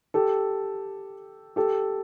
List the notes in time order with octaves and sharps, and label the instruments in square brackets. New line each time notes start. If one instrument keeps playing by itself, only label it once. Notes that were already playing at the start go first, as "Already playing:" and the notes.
[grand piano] G4 A4
G4 A4